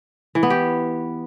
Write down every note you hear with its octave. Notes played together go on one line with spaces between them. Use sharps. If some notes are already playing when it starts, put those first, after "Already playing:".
E3
B3
G4